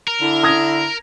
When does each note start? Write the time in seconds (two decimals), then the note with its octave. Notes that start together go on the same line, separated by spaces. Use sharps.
0.08 A#4
0.21 D3 E4
0.43 D#6 G#6 A#6